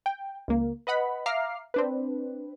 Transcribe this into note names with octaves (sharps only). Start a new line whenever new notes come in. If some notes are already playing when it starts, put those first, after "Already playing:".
G5
C#2 A#3
B4 D#5 F#5 B5
E5 F5 A#5 D6 F6 C7
C4 D4 B4